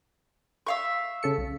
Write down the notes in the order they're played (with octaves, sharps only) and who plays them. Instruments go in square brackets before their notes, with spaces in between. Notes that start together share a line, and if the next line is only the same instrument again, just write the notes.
[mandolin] E5 F5 C#6
[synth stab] C#3 A4 C#7
B1